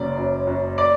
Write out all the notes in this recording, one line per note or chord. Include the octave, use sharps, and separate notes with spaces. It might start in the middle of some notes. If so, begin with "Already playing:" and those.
Already playing: F#1 F#2 D5
F#2
F#2
D5